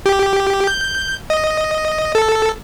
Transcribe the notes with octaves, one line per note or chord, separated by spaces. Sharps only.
G4
G6
D#5
A4